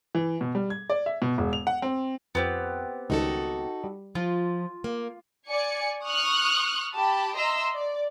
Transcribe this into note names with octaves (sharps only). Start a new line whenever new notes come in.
E3
B2
G3
G#6
D5
E5
B2
E1
F7
F#5
C4
F2 B3 C4 G4
C#2 D#3 G3 D#4 F#4 A4
G3
F3 F4
A#3
D5 G#5 C#7
C#6 D#6 F6 F#6
G4 A5 B5
D#5 E5 A#5 C6 E6
D5